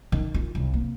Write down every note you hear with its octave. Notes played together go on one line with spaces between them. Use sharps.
D#3
F4
C2
A#3